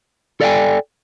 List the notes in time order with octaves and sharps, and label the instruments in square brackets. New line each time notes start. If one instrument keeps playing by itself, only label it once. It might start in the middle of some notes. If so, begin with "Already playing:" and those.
[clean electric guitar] A4 D5 E5 F5 G5 G#5